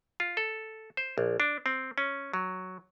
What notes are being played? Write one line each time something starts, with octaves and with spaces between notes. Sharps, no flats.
F4
A4
C5
A#1
D4
C4
C#4
F#3